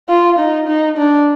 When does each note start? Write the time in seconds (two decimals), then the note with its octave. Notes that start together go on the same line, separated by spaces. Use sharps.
0.09 F4
0.39 D#4
0.68 D#4
0.97 D4